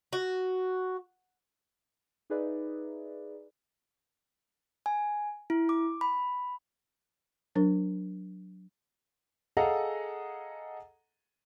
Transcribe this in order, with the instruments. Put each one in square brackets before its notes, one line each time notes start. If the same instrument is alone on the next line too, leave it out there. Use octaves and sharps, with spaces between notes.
[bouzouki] F#4
[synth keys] D#4 G#4 B4 D5 E5
[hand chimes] G#5
E4
D6
B5
[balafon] F#3 D4 A#4
[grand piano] G#4 A4 D#5 F5 F#5 A#5